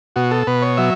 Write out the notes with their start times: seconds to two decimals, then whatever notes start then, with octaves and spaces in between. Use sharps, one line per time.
0.16 B2 F#4
0.31 A4
0.47 B2 B4
0.62 C#5
0.77 F#3 E5